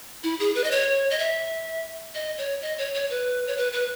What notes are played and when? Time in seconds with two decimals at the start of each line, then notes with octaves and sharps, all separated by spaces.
0.24 E4
0.40 G#4
0.55 B4
0.64 D#5
0.71 C#5
1.11 D#5
1.19 E5
2.15 D#5
2.38 C#5
2.62 D#5
2.78 C#5
2.94 C#5
3.10 B4
3.47 C#5
3.57 B4
3.73 B4